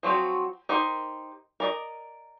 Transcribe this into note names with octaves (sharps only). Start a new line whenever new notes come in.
F3 F#3 C4 F#4
D#4 G4 A#4 C5
A#4 D5 D#5